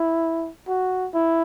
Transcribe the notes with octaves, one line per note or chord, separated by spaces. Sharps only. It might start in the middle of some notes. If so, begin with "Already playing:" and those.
Already playing: E4
F#4
E4